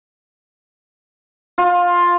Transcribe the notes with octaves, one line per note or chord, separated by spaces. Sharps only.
F4